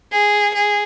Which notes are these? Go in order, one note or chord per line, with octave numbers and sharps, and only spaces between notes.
G#4
G#4